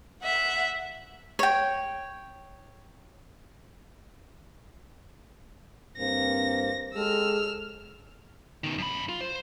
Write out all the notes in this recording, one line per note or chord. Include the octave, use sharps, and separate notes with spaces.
E5 F#5
C#5 G5
G2 A#3 C4 A#6
G#3 G4 A4 E6 F6
B2 D#3
F#2 B5
F4
C5